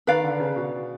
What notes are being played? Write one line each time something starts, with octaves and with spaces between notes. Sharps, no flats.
D#3 B4 D5 F5
D3
C#3
B2